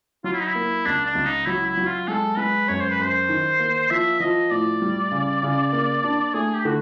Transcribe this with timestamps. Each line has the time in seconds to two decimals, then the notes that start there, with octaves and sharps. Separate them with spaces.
0.24 F#3 F4
0.33 E4
0.40 D#4
0.48 E4
0.55 A#3
0.86 C#2 D4
1.06 D4
1.15 C#2
1.26 D#4
1.46 F#3 E4
1.67 E4
1.77 F#3
1.87 F4
2.08 G#3 A4
2.37 G#3 B4
2.68 F#2 C#5
2.80 C5
2.91 B4
2.99 F#2 C5
3.29 D#3
3.60 A#3
3.90 F3 E5
4.20 F3 D#5
4.51 A2 D5
4.82 G3
5.11 C#3
5.43 C#3
5.73 A#3
6.04 D4
6.34 A3 G#4
6.55 G4
6.65 D3 F#4